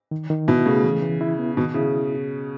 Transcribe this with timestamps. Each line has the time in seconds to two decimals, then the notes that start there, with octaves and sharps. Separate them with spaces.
0.11 D#3
0.30 D#3
0.48 B2 E4
0.66 C#3 A3
0.84 E3
1.02 E3
1.21 E4
1.39 B3
1.57 B2 D#3
1.74 C#3 E4